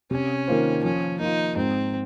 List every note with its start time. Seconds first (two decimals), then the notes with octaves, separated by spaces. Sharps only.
0.11 C3 C#4
0.48 D#3 A#3 F4 C5
0.83 F3 C#4
1.20 A#3 D#4 F4
1.56 G#2 C4